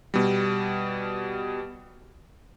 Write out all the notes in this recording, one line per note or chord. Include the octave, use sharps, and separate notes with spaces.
B2 G3